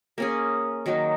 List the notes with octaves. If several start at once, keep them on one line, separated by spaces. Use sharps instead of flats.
A#3 C#4 G#4
D#3 F#3 A#3 D#4